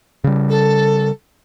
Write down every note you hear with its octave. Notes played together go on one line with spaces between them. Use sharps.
C#3 G3
A4